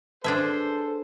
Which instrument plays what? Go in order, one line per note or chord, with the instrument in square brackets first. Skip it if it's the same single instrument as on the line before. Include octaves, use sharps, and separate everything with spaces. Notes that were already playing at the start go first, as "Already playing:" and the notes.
[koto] D4 G#4 E5 [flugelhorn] A4 [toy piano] B4 A5 [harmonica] C5